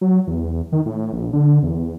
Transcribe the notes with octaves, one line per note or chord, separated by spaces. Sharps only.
F#3
E2
D#3
A2
A#1
D3
E2